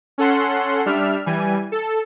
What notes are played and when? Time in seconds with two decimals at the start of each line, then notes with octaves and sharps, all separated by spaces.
0.18 C#4 A4 F#5 C6
0.86 G3 D4 E5 F6
1.26 E3 G3 G#5
1.72 A4